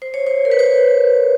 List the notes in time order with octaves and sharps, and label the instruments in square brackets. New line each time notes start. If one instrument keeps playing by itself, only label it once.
[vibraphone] C5
C#5
C5
A#4
B4
C5
C#5